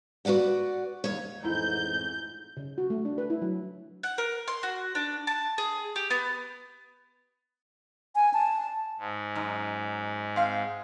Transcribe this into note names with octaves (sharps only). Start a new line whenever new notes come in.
F#4 A#4 B4 D5 F#5
D#2 C#5
A1 F2 G#2 E4 A#5 G6
C#3
F#4
A3
D4
B4
E4
F#3
F#5
A#4
C6
F#4
D4
A5
G#4
G4
B3
G#5
A5
G#2
F#2 D#4
C4 F5